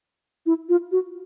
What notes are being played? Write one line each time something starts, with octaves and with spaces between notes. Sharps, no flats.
E4
F4
F#4